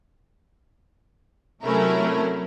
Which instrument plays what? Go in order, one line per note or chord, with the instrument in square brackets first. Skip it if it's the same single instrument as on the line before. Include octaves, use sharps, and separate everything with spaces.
[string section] C3 F#3 A3 C#4 E4 A#4